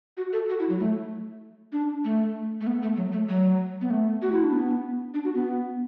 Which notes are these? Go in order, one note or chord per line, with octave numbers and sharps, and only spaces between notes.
F#4
A4
F#4
E4
F#3
A3
D4
A3
A3
B3
A3
F#3
A3
F#3
B3
A3
F#4
E4
D4
B3
D4
F#4
B3